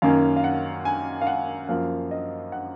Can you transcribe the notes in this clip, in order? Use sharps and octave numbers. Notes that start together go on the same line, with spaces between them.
F#2 D#3 A#3 C#4 F5
F5
F#5
G#5
F5
F#5
F#2 F3 A#3 F5
D#5
F#5